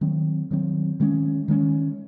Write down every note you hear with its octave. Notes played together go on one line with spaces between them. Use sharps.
D#3 F#3 C4
D#3 F#3 C4
D#3 G#3 C#4
D#3 G#3 C#4